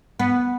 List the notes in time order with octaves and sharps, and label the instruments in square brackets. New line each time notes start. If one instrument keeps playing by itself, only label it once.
[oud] B3